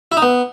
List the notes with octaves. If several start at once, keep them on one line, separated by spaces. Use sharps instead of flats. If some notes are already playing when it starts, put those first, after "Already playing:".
E4
D#4
B3